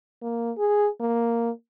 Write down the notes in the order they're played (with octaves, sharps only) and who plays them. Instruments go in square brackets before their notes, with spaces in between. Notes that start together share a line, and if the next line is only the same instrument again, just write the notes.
[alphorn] A#3
G#4
A#3